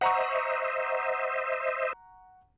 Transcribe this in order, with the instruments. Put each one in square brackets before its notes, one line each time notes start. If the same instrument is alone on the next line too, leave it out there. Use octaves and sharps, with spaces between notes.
[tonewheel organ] C5 D#5 E5 [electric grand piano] F#5 A#5 C#6